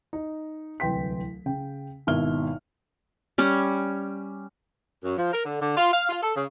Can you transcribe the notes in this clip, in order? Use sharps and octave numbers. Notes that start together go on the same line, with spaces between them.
D#4
D1 C2 E3 G5 C6 B6
C#3 G5
G#1 B2 E4 F6 G7
G3 C#4
F#2
F3
A#4
D3
D3
F4
F5
F4
A4
C#3